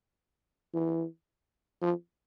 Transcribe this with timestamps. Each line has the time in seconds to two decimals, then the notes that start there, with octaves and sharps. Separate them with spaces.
0.74 E3
1.82 F3